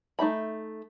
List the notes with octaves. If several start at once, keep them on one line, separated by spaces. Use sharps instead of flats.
A3 D#4 E5 B5